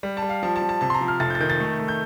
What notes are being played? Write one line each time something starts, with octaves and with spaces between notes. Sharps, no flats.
G3
A5
G3
F5
F3 A5
A5
F3
A5
C3 A5
C6
A#5
F3
F6
F1 A6
G6
A6
D#3 G6
A6
A3
A3
G6